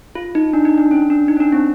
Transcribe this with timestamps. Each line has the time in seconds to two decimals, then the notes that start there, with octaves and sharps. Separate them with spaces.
0.15 F4
0.35 D#4
0.53 D4
0.65 D#4
0.78 D4
0.91 C#4
1.10 D4
1.28 D#4
1.36 C#4
1.40 D4
1.52 C4